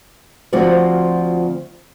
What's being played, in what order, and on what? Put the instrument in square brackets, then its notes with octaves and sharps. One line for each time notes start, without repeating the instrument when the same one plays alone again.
[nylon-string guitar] D2 F3 C4 F4 F#4 D5